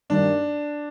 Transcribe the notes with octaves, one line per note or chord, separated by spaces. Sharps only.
G2 D#3 G3 A#3 D4